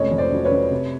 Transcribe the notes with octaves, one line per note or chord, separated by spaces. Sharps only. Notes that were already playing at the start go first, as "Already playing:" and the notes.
Already playing: F1 C#2 C#5 D#5
F2
C5 D5
F#3
B4 C#5
F#3
C3